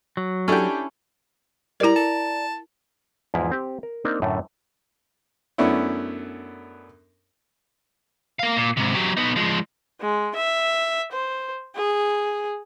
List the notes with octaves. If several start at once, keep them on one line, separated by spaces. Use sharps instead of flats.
F#3
C#4 D4 E4 G4 A4
G3 E4 A#4 D5 A#5
A5
E2 G#2 F3 E4
C4 G4
A#4
A#3 C4 D4 D#4 A#4
F#2 A2 D3 A3
F#2 A3 B3 C#4 D4 E4
A#3 F5
A#2
G#2 C3
F#3 G4
B3 D#4
F3 G#3
G#3
E5
C5
G#4